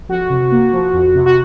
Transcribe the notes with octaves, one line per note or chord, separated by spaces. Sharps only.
F2 F#4
C3
A#3
F3
F2
C3
F#4